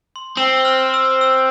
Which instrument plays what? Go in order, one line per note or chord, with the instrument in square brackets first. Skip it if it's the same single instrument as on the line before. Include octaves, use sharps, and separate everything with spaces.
[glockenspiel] C6
[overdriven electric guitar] C4 [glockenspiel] E6
[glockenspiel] E6
F6
E6
E6